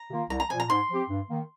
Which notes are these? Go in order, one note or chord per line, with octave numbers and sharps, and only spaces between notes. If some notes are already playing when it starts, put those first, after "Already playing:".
Already playing: A#5
C3 D#3 A#3 F4
C2 A#5
A#5
A#2 F3 G#5
A#5
G#2 C6
F3 C4 G4
G2
D#3 A#3